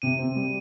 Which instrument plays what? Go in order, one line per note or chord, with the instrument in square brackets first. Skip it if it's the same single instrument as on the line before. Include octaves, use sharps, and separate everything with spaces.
[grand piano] C3 [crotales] D#7
[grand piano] C4
G3